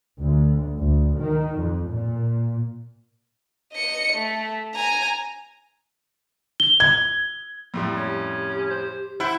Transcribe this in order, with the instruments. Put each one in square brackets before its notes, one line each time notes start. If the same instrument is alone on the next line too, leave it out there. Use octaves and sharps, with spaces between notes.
[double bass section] D2
D2
D#3
F2
A#2
[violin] D#5 C#7
A3
G#5 A#5
[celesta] G7
[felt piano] G#6
[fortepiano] F2 A2 G3
[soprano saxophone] C#4 [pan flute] G4
[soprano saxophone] C5
[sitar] E4 [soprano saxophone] C5 [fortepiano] F#5